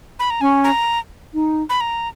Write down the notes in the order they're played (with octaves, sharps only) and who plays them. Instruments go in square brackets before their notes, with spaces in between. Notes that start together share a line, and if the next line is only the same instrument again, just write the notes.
[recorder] B5
A#5
[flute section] C#4 [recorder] G#5
[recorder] A#5
[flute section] D#4
[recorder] B5
A#5